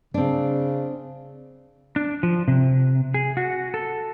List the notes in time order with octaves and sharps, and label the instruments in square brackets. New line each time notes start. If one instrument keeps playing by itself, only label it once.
[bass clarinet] C#3 [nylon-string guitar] C4 D4
[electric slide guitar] D4
F3
C3
G#4
F#4
A4